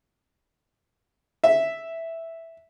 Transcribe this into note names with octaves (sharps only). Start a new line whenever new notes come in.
E5